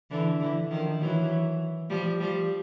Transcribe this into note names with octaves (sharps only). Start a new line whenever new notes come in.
D3 E3
D3 E3
D#3 F3
E3 F#3
F3 G3
F3 G3